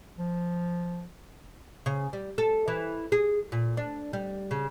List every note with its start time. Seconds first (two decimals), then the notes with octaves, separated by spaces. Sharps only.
0.19 F3
1.86 C#3
2.13 G3
2.38 A4
2.68 E3
3.12 G#4
3.52 A#2
3.77 D4
4.13 G3
4.51 C#3